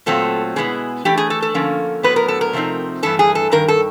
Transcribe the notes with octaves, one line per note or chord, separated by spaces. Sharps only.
A#2 F#3 A3 C4 F4 A4
B2 G#3 B3 E4 G#4
E3 A3 D4 G4
G#4
A4
A4
D3 F3 A#3 C#4
A2 F#3 B3 B4
A#4
A4
A#4
C3 F3 A3 C4 D#4
G2 E3 A3 A4
G#4
A4
G2 D#3 A#4
A4